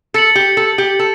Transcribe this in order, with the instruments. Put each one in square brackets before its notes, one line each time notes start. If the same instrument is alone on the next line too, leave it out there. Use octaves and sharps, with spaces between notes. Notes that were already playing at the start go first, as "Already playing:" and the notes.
[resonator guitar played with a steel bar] A4 [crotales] A6 C#7 F#7
[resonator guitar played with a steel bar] G4
A4
G4
A4